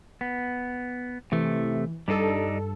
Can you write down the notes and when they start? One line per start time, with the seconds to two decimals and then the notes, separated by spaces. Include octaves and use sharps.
0.21 B3
1.32 C3 E3 A3
2.08 G2 G3 D4 D#4 A4